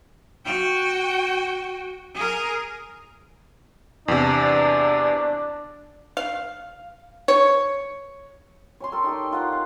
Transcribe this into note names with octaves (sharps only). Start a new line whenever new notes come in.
F#4 G5
G#4 A#4
E2 C3 D4
F5
C#5
C#5 G#5 C6
A4 A#4 G5
D#4 G4 D#5
D#4 F4 F#5
F5